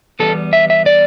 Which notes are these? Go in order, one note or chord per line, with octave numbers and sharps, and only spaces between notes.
E2 B2 G3 B3 A4
E5
E5
D5